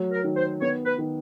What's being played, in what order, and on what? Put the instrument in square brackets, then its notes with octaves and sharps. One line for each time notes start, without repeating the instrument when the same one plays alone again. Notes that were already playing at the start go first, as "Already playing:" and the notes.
Already playing: [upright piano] F#3 A3
[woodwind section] A#4
[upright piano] D#3
[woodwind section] C5
[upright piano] B3 [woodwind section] C#5
[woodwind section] B4
[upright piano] D#3